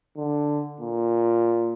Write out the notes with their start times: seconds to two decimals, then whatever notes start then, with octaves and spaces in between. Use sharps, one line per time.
0.17 D3
0.80 A#2